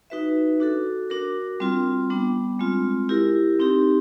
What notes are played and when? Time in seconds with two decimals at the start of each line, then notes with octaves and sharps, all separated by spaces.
0.10 D#4 F#4 B4 E5
0.60 D4 F#4 A4
1.10 D4 F#4 A#4
1.60 G3 C4 F4
2.10 G3 B3 D4
2.59 G#3 C4 F4
3.09 E4 G4 A#4
3.60 C4 D#4 G4